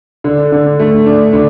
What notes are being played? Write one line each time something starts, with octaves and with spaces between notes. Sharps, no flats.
D3
D3
A3
D4
D3